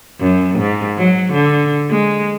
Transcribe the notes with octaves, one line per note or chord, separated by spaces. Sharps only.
F#2
G#2
F#3
D3
G#3